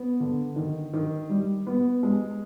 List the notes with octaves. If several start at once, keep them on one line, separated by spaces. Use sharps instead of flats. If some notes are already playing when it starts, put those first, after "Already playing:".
Already playing: B3
D3
D#3
D#3
G3
B3
G#3